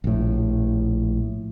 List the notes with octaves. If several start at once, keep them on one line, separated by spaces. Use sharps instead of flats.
A#1 A2